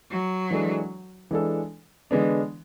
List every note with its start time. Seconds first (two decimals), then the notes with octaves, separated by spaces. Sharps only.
0.10 F#3
0.51 E3 G#3 D4 A4
1.31 E3 G#3 D4 A4
2.11 D3 E3 G#3 B3 D4